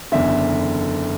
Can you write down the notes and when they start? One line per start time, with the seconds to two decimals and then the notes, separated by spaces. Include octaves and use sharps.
0.12 F#1 E2 D3 E5